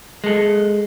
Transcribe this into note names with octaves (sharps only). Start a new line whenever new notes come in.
G#3 A4